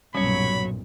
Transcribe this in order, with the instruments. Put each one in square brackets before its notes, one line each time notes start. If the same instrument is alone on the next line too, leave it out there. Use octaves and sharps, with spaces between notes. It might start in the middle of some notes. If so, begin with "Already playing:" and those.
[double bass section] B1 G2 A#2 [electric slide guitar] F#3 C#5 [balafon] G3 C#4 [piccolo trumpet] B5